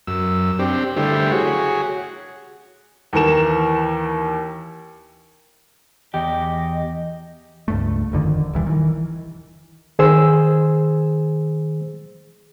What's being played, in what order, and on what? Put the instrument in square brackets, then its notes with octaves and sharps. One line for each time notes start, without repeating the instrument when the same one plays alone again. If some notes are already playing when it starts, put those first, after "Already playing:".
[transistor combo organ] F#2 E6
C4 D4 G4
D3 G3 A3 E4 G4 C5
F#4 G#4 C#5
[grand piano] D#2 E3 A#4 E7
[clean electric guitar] E2 G4 [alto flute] D#5
[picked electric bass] C#2 G2 A3
G1 F2 D3 D#3
D#1 C2 E3 G3
D#3 E3
[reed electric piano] D#3 G#4 C5 E6